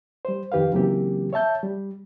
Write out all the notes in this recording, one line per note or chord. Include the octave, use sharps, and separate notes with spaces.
G3 C5
F2 D#3 G4 B4 F5
C#3 E3 F#3 A#3 C4 G4
C#5 E5 A5 G6
G3